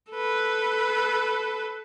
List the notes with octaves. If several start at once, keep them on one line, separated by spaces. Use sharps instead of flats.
A4 B4